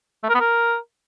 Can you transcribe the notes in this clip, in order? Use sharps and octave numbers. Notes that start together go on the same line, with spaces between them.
A3
A#4
B3
A#4